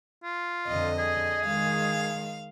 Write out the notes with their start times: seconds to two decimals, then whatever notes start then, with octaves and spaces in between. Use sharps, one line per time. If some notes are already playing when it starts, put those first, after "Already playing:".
0.24 F4
0.68 F2 D3 D#5
0.99 G#4
1.46 D#3 G#3 F5